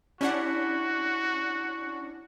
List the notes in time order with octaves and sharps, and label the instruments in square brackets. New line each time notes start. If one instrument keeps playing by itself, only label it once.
[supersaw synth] C#4 D4 F#5 [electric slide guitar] E4 G4 [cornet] F#4